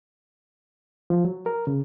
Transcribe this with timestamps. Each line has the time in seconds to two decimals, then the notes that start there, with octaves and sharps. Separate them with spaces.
1.10 F3
1.25 F#3
1.46 A#4
1.67 C#3